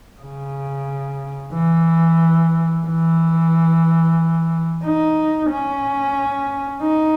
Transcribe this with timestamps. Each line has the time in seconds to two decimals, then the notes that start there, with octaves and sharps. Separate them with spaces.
0.21 C#3
1.52 E3
2.86 E3
4.84 D#4
5.50 C#4
6.82 D#4